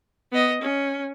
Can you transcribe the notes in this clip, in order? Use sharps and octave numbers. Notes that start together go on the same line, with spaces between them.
B3 D#5
C#4